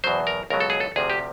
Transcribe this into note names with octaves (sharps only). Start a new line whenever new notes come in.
E2 B2 F#3 C5
A#4
C#2 B2 F#3 A#4
A4
G#4
A4
D2 C3 F3 G#4
G4